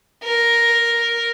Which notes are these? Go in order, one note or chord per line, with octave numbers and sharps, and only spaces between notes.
A#4